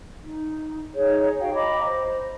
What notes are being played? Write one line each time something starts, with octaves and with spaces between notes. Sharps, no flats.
D#4
D#4 G#4 C#5
F#4 C#5 F5 G5
D#5 A#5 B5 D6
C5